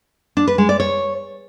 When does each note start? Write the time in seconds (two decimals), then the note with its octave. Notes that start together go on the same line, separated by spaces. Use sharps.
0.37 D4
0.47 B4
0.58 G#3
0.69 D5
0.80 C#5